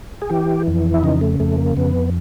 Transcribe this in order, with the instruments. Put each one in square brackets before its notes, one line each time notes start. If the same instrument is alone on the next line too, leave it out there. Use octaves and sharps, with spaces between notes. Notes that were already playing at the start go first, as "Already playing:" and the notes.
[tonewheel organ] G#4
E3 G4
F2
E4
C#3 D#4
A3
F2 A3
A#3
F2 B3